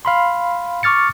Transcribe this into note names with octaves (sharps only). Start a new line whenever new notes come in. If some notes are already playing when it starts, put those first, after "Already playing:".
F5 B5 C6
C#6 D6 F6 A6 C#7